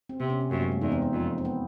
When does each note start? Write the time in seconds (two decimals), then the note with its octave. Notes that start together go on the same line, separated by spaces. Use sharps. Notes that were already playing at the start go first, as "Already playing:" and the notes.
0.09 C4
0.20 C3 B3
0.30 C#4
0.41 C4
0.51 F#2 A#3
0.62 A3
0.67 G#3
0.72 A3
0.81 E2 D#4
0.92 C4
1.02 B3
1.13 F2
1.38 C4
1.45 B3